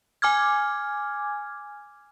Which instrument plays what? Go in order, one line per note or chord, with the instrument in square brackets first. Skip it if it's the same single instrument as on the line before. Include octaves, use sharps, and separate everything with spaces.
[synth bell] G#5 D6 F6 G#6